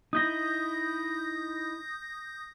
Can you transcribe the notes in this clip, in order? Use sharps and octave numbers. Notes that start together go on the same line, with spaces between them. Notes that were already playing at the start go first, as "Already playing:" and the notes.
D#4 E4 D#6 G6 A#6